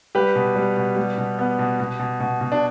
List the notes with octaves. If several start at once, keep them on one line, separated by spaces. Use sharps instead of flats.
G3 G4 B4
B2
G3
B2
G3
B2
B3
B2
B2
B2
B2
B2
D4